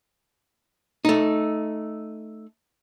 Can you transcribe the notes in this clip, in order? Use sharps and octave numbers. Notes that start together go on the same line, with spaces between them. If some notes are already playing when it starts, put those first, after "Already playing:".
A3 D#4